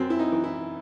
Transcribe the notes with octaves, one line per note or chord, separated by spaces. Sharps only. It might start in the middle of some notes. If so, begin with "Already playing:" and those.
Already playing: F#2 C4
E4
D#4
E3
E4